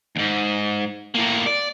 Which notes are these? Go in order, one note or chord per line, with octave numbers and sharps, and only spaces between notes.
D#2 G#2
A2 A#3
D5